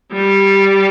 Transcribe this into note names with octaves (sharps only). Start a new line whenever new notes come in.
G3